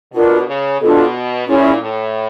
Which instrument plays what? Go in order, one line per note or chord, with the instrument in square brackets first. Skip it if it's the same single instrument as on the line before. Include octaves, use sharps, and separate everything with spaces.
[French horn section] B2 [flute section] D4 F4 A#4
[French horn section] C#3
[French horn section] B2 [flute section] D4 F4 A4
[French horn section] A#2 [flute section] C#4 E4 G#4
[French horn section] A2